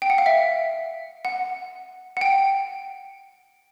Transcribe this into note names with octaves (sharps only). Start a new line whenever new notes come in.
G5
F#5
F5
E5
F#5
F#5
G5